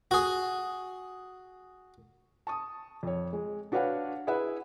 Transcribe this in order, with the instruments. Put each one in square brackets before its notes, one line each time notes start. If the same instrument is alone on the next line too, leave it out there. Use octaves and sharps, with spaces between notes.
[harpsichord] F#4 G#4
[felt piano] A5 C#6 D#6
F2 C#5
G#3
D4 F#4 B4 C#5 F5 F#5
E4 G#4 B4 E5 F#5